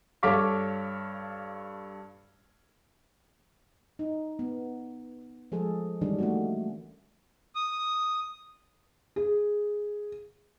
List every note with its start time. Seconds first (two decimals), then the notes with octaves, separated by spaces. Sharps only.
0.23 G2 A4 C#5 F5 D6 B6
3.99 D#4
4.39 B3
5.52 F3 G#3 G#4 A4
6.01 D#3 E3 G3 G#3 C#4 D4
6.19 A3 A#3 F#4
7.55 D#6
9.16 G#4